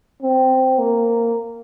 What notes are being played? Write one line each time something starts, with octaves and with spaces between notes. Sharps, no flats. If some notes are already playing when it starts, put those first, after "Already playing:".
C4
A#3